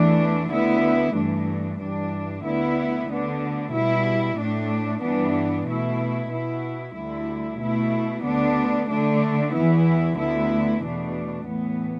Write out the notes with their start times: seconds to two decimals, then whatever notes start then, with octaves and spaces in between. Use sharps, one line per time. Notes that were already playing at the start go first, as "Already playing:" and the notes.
Already playing: E2 E3 A3 D4
0.50 D2 D3 B3 E4
1.15 G2 E3 A3 D4
1.79 G2 E3 G3 D4
2.44 D2 D3 B3 E4
3.08 D2 D3 B3 D4
3.73 B2 G3 E4
4.38 A2 A3 D4
5.03 G2 E3 B3 D4
5.66 B2 A3 E4
6.31 B2 B3 E4
6.95 D2 D3 G3 E4
7.60 B2 A3 E4
8.24 D2 D3 B3 D4
8.90 D3 A3 D4
9.54 E2 E3 B3 E4
10.18 D2 D3 B3 E4
10.83 E2 B2 A3 D4
11.47 A2 E3 B3